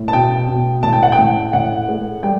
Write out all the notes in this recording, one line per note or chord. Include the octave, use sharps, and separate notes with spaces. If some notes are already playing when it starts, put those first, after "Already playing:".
Already playing: A2
A5
B2 G5
B2
A2 A5
G5
F#5
G5
A2
A2 F#5
A3
G3 G5